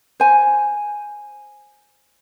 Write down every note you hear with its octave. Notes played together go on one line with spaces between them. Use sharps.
C5 G#5